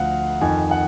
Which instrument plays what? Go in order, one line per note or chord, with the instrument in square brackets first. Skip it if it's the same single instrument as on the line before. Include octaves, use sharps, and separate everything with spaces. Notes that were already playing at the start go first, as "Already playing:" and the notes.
Already playing: [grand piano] D2 D3 F3 F5 F#5
F2 D#3 G#5
F#5